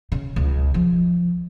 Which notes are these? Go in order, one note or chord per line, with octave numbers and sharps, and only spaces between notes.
C#3
C#2
F3